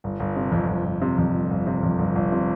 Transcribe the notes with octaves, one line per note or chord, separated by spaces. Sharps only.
G1
G1
C3
F2
G1
G1
C3
F2
G1
G1
C3
F2
G1
G1
C3